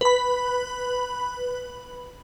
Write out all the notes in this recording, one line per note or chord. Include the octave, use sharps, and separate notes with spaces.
B4 B5